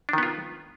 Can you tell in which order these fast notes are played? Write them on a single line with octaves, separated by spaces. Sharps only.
D4 D#3 B3 F4